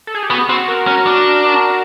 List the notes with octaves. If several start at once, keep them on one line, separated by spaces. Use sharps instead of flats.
A4
G#4
G4
B3 F#4
C4 F#4
A#4
C#4
D4